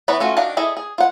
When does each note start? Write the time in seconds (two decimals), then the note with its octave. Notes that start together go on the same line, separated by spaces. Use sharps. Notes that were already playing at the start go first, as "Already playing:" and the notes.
0.08 E3 B3 C#5 D5 B5
0.20 A3 C#4 F4 F#4
0.37 D#3 D4 F#4 F5 A5
0.57 E4 G#4 A4 D5 D#5
0.77 G#4
0.98 F4 F#5